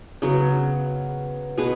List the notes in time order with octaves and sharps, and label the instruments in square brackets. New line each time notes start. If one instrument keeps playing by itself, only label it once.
[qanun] C#3 F#3 B3
B2 B3 G#4 B4